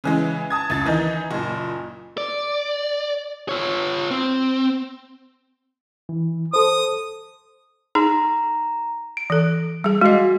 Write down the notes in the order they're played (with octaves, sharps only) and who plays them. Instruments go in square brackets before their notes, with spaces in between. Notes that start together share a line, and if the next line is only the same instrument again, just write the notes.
[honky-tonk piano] C#3 E3 G#3
A5 D#6 G#6
C#2 A6
D#3 E3 D#4
F#1 A#2
[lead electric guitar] D5
F4 C#5
C4
[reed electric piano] E3
[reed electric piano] A4 C5 [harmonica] D#6
[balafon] D#4 G#4 [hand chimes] A#5
[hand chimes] D7
[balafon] E3 A4
G3 G#4
[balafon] G#3 D#5 [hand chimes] F#4 G#4